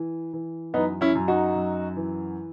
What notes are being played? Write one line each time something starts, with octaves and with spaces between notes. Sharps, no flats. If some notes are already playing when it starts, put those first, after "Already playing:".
Already playing: E3
E3
F#2 B3 D#4
C#4 E4
F#2
D#4 F#4
F#2
E3